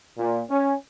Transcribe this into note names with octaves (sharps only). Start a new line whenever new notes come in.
A#2
C#4